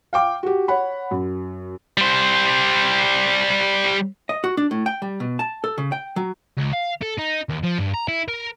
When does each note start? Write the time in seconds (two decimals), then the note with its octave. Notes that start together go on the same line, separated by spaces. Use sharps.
0.13 F5 G5 D6
0.43 F#4 G4
0.68 C#5 F#5 B5
1.11 F#2
1.97 G3 C5
4.29 D#5
4.44 F#4
4.57 D4
4.71 A2
4.86 G5
5.02 G3
5.20 B2
5.39 A5
5.64 A4
5.78 C#3
5.92 G5
6.16 F#3
6.58 C#2
6.73 F5
7.03 A4
7.18 D#4
7.50 D#2
7.64 F3
7.78 G2
7.94 A#5
8.08 E4
8.28 A#4